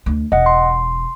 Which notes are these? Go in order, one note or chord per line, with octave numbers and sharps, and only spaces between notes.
D2
E1 D#5 F#5
C6